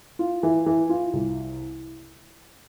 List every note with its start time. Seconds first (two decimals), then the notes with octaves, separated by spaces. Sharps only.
0.19 F4
0.43 E3
0.66 E3
0.89 F4
1.13 C2